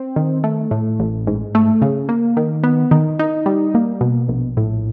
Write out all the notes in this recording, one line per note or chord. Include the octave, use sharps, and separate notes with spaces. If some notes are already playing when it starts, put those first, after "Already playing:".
Already playing: C4
D#3
A3
A2
A1
G#2
A3
C#3
A#3
D#3
B3
D#3
D#4
G3
A#3
B2
A#1
A2